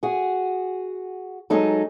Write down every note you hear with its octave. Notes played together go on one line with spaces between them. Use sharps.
F#4 G#4
F#3 G#3 D#4 A4